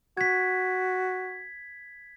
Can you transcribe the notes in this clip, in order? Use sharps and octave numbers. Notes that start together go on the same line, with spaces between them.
F#4 G#6 B6